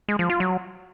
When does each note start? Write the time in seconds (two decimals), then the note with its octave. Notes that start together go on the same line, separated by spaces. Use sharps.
0.08 G#3
0.19 F3
0.30 F4
0.40 F#3